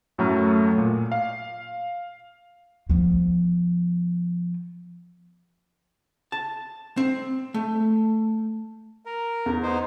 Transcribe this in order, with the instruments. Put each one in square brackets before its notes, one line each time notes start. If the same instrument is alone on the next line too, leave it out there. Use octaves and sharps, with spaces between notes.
[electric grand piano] F#2 A2 F#3 A3 A#5 F6
A#2
F5
[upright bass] F3 B3
[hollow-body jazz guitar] A5
C4
A3
[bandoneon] A#4
[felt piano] E2
[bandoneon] B3 D#4 C5